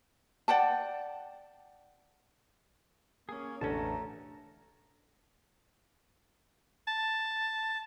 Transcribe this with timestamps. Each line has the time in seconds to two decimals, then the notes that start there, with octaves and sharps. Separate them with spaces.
0.48 D5 F#5 G5 A5
3.29 A#3 C#4 G#4
3.61 A1 E2 D3 A3 C#4 A5 A#5
6.87 A5